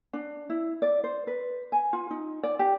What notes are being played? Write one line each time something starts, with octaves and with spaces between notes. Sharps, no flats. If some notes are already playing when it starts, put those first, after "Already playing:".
D4
E4
D5
C5
B4
G#5
F4
D#4
D5
G4